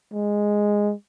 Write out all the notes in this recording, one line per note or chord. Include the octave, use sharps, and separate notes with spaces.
G#3